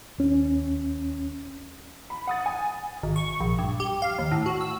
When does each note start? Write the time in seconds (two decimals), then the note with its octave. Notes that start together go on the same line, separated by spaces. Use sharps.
0.18 D#2 C#4
2.10 B5
2.27 F#5 D#6 A6
2.46 G#5
3.03 G#1
3.16 C#6
3.40 A#1
3.59 G2
3.80 G4
4.02 F5
4.18 D#2
4.31 A2
4.46 F#4
4.61 E6